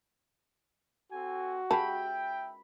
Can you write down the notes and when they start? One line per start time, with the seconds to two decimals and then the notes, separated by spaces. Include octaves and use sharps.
1.12 C4 F#4 A4 G#5
1.71 G4 G#4 E5 G5 A5 B5